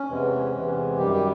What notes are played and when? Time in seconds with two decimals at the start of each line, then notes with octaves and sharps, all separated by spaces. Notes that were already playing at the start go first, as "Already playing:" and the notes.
Already playing: C#4
0.10 E2 C3 E3 G#3
0.53 E2 C3 E3 G#3
0.98 F#2 D#3 G3 G4
1.13 G4